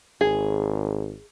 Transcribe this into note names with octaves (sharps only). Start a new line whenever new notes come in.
G#1 G#4